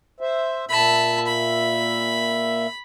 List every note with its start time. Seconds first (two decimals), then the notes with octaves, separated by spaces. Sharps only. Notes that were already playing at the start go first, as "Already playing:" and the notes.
0.20 C5 E5
0.69 A#2 E5 A5 B5
1.26 B5